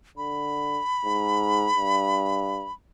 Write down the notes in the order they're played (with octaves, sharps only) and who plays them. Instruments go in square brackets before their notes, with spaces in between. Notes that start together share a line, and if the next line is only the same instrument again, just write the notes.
[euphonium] D3 [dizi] B5
[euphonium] G#2
G2